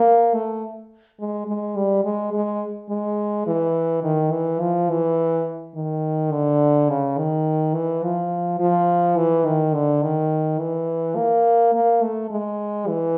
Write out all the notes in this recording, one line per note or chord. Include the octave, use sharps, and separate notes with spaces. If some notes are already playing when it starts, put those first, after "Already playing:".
Already playing: A#3
A3
G#3
G#3
G3
G#3
G#3
G#3
E3
D#3
E3
F3
E3
D#3
D3
C#3
D#3
E3
F3
F3
E3
D#3
D3
D#3
E3
A#3
A#3
A3
G#3
E3